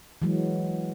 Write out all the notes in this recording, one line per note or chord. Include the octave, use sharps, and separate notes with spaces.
E3 F#3 G#3